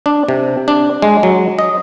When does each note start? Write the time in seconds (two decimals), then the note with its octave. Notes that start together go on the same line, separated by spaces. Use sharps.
0.06 D4
0.28 C3
0.68 D4
1.02 G#3
1.23 F#3
1.59 D#5